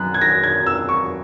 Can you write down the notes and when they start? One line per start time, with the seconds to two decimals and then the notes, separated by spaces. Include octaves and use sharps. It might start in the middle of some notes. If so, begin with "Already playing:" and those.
Already playing: F#2 F#6
0.14 G#6
0.21 A#6
0.44 G#6
0.66 E6
0.89 C#6